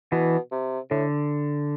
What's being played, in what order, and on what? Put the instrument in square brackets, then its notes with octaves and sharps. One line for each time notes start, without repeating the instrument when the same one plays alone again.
[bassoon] B2 [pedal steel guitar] E3
[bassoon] C3
[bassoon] A2 [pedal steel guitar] D3